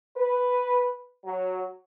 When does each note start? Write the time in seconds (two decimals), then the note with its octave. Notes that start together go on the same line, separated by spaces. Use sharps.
0.17 B4
1.25 F#3